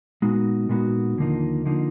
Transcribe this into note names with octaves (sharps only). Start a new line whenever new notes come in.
A#2 G#3 B3 D#4 F#4
A#2 G#3 B3 D#4 F#4
D#2 D3 F3 A#3 D#4
D3 F3 A#3 D#4